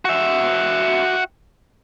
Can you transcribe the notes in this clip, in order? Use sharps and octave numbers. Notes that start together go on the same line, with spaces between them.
F#4 E5